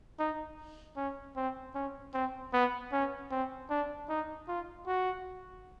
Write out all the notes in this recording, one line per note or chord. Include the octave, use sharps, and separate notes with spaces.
D#4
C#4
C4
C#4
C4
B3
C#4
C4
D4
D#4
F4
F#4